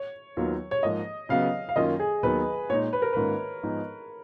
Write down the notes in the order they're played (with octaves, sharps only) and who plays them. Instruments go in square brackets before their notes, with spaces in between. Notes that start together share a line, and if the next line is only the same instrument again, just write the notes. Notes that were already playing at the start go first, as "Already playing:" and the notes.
Already playing: [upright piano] C#5
[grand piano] D#2 D#3 F#3 B3 F4
[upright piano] C#5
[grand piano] G#2 F3 A#3 [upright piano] D#5
[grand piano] C#3 F#3 B3 [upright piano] F5
[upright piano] F5
[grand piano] F#2 D#3 A#3 C#4 F4 [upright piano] D#5
[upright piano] G#4
[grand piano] D#2 D#3 F#3 B3 [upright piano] B4
[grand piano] A#2 G#3 D#4 [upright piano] C#5
[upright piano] B4
A#4
[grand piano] G#2 D#3 A#3 C#4 F4 [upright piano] B4
[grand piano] G#2 F3 G#3 B3 D#4